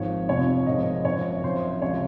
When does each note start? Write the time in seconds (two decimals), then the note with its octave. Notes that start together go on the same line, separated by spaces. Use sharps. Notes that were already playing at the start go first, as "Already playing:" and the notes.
Already playing: G#1 G#2 F3 C#5
0.28 F1 F2 C3 F3 C#5
0.66 G#1 G#2 F3 D#5
1.05 G#1 F#2 F3 C#5
1.43 G#1 F#2 F3 C5
1.81 C#2 C3 F3 C#5